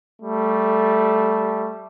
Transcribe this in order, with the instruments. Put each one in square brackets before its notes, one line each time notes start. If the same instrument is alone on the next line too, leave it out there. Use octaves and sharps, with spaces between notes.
[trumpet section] G3 A3